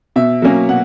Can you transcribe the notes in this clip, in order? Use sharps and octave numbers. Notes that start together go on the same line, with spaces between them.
B2 E5
F#3 A#3 C#4
B2 F#5